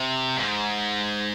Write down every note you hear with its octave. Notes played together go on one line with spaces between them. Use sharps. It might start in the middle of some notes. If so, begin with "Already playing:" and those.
Already playing: C3
G#2